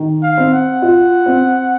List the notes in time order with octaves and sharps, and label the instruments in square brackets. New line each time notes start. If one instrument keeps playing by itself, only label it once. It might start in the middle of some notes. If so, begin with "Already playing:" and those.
Already playing: [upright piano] D#3
[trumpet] F5
[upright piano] C4
[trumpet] F#5
[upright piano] F4
C4